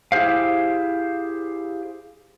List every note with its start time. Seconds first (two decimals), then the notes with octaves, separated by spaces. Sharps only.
0.12 E4 G4 G#4 C5 F5